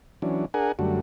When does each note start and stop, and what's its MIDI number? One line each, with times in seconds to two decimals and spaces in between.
0.22 0.45 52
0.22 0.45 54
0.22 0.45 61
0.22 0.45 62
0.54 0.72 62
0.54 0.72 68
0.54 0.72 70
0.54 0.72 78
0.54 0.72 80
0.79 1.00 42
0.79 1.00 50
0.79 1.00 55
0.79 1.00 57
0.79 1.00 66